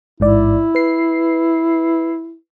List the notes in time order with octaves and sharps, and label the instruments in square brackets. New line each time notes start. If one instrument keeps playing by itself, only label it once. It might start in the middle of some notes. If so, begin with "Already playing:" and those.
[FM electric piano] A1 G#2 D5 [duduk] E4
[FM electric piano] B4 C7